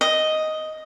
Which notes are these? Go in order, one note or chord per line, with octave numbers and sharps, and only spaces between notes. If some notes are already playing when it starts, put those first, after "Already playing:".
D#5